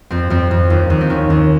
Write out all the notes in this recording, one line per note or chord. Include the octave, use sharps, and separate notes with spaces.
F2 C4
F2 C4
F2
D#2
D#2
C4
D#3 C#4
D#2